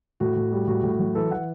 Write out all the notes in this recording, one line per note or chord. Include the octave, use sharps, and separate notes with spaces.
A2 F#4
A2
G3
A2 F#4
A2
F#3
E3 A4
E3 F#5